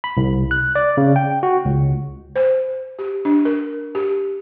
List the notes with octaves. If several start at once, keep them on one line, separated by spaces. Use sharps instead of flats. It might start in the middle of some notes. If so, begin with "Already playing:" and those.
B5
C2
F#6
D5
C#3
G5
F#4
C#2
C5
G4
D4
A#4
G4